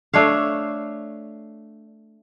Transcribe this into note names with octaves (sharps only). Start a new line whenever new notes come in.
A3 D4 C#5 F5